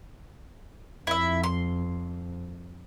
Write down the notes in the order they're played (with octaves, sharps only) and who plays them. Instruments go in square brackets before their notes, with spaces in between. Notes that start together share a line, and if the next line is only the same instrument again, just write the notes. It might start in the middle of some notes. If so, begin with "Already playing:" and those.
[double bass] F2 [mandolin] E4 E5
[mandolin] C6